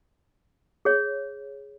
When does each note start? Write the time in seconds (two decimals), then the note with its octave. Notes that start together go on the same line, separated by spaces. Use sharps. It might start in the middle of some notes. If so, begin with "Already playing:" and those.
0.85 G#4 C#5